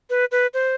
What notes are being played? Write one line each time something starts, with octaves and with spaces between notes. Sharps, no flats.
B4
B4
C5